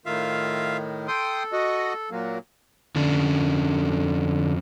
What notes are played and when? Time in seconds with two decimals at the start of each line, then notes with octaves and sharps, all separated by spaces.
0.06 A2 D#3 F4 E5 F5
1.08 A4 G5 C6 D#6
1.53 F#4 D#5
2.11 A#2 F#3 A#3
2.95 F2 D3 C#4 D5